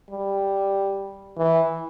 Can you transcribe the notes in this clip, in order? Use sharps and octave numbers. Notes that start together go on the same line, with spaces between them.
G3
E3